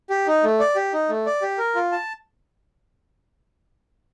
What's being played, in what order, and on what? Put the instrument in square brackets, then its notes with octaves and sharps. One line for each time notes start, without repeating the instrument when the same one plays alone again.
[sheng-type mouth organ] G4
D#4
A3
D5
G4
D#4
A3
D5
G4
A#4
F4
A5